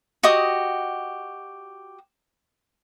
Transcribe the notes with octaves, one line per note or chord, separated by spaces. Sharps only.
F#4 G4 D#5 D#6